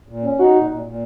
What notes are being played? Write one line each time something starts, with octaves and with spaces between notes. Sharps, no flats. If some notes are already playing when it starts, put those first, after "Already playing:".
A#2
C#4
D#4 F#4
A#2
A#2
A#2